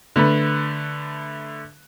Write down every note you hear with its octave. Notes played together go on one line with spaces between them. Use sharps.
D3 A3 B4 B5